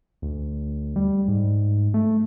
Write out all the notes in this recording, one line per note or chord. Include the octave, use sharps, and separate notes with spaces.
D2
G3
G#2
A3